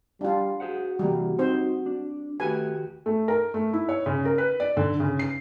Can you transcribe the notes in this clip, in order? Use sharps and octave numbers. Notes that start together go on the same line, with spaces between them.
G3 D4 F4
F#4 G#4 C5 F#5
C2 E3 G3 A#3
C4 D#4 C5
D4
D#2 A3 F#4 G4 B4 G#5
A3
A#4
A3
E4
C#5
C#3
A#4
B4
D5
D3
C#3
C7